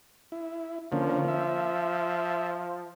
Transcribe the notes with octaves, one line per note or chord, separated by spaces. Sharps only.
E4
D3 F3 A#3 C#4
E5